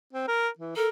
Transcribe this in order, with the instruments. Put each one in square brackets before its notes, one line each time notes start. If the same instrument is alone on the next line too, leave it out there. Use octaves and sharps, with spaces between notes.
[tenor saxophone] C4
A#4
E3
[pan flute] A4 [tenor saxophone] A#4